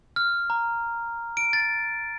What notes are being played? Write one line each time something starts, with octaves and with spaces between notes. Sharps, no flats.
F6
A#5
D7
A6